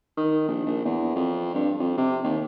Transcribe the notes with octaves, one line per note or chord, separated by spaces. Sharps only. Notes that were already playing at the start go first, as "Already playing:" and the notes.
D#3
A#1
A#1
E2
F2
G2
F2
C3
D#2